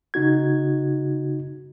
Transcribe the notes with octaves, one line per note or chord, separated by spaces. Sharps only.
C#3 D#4 F#4 G#6